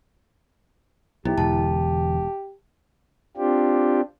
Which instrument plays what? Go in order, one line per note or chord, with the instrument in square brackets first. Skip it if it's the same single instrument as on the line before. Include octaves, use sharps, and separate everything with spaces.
[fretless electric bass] B1 [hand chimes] E4 [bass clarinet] G4
[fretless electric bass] E1 [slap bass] E2 B2 D3 [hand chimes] A5
[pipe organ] C4 D4 F4 G4